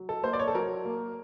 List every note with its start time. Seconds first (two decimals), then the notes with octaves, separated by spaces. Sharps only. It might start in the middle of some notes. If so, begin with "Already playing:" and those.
Already playing: F#3
0.09 A4
0.23 A#3 C5
0.33 D5
0.39 C#5
0.48 A4
0.55 F#3 A#4
0.85 A#3